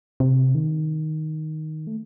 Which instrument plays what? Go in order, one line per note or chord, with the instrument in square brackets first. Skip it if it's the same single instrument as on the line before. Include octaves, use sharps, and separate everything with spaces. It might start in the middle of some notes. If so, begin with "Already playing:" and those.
[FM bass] C3
D#3
A3